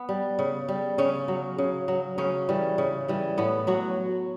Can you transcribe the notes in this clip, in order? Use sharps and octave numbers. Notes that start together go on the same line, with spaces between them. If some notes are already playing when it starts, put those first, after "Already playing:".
Already playing: B3
G3
C#3
G3
C#3 C#4
F#3
C#3
F#3
C#3 C#4
E3 G3
C#3
E3 G3
A2 B3
F#3 F#4